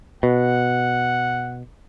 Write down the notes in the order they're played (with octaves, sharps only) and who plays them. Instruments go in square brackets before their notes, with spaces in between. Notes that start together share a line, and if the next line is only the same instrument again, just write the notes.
[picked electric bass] B2 [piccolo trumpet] F#5